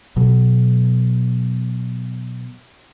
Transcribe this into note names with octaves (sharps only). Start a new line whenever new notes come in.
B2 F#3